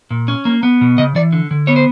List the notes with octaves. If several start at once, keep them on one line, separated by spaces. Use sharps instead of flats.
A#2
C#4
A#3
B3
B2
C#3 D#5
E3 D5
D3
D3
B3 C#5
C5